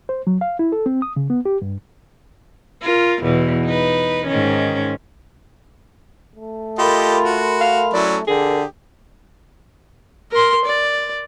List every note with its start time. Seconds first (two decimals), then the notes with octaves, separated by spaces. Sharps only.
0.09 C5
0.27 F#3
0.41 F5
0.59 E4
0.72 A4
0.86 C4
1.02 D#6
1.16 C#3
1.30 B3
1.45 G4
1.62 G2
2.82 F4 A#4
3.23 E2 B2
3.66 D#4 B4
4.27 G#2 D#3 C#4
6.36 A3
6.78 F4 G4 A4 A#4 D#5 B5 C6
7.24 F#4
7.61 F5
7.94 F#3 C#4 E4 D5
8.28 D3 G4 G#4 A#4
10.32 A#4 C6
10.65 D5